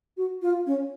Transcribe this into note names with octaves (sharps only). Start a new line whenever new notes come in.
F#4
F4
C#4